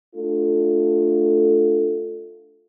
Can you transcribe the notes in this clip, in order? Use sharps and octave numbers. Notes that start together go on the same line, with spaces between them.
A3 D4 F4 A4